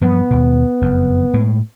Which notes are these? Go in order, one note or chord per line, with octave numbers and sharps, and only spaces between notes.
G2 F3 F#3 B3
D#2 B2
F#1 F2
A2 G#3